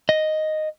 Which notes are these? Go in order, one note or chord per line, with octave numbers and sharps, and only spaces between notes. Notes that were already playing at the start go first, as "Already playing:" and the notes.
D#5